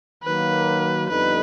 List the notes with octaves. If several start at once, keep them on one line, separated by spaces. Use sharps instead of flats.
D#3 F#3 A#3 B4
F2 D3 G3 B3 D#4 B4